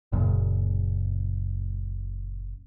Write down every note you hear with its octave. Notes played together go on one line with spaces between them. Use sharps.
F#1 F#2 A#2 C#3